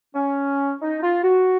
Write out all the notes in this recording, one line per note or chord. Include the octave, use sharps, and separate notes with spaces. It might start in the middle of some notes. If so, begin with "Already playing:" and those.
C#4
D#4
F4
F#4